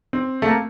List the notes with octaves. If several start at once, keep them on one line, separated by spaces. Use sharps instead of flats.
C4
A3
A#3